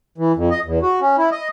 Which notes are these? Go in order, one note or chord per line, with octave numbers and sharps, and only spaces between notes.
E3
F2
D#5
E2
F#4
C#4
E4
D#5